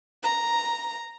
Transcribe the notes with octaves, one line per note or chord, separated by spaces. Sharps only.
A#5